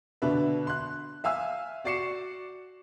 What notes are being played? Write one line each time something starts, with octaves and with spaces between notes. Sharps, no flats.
B2 D3 D4 B4 E5
C6 F#6
E5 F5 G#5 E6
F#4 D5 C#6 C7 C#7 E7